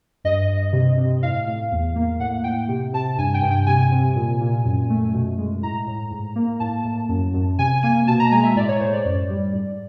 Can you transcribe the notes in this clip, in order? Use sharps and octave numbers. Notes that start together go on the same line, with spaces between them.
G2 D#5
G2
C3
C3
A2 F5
A2
E2
A#3
A2 F#5
A2 G5
C3
C3 A5
G2 G#5
G5
G2
G5
C3 G#5
C3
A#2
A#2
F#2
A3
B2
G#3
A2 A#5
A2
G#2
A#3
A2 A5
A2
F#2
F#2
C3 G#5
A#3 G#5
B2 A5
A#5
G#3 G#5
E5
A2 D5
C#5
A2 C5
D5
F#2
G3
G#2